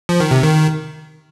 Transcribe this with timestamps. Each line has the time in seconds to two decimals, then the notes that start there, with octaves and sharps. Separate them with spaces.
0.09 F3
0.20 D#3
0.31 C3
0.43 D#3